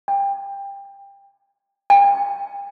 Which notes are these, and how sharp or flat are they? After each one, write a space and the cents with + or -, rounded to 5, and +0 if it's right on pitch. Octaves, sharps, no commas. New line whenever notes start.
G5 +20
G5 +40